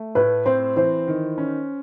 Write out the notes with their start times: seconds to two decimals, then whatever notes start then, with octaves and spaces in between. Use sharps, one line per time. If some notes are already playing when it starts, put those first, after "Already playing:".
Already playing: A3
0.15 A2 B4
0.46 C4 C5
0.77 E3 C5
1.08 D#3
1.38 C#4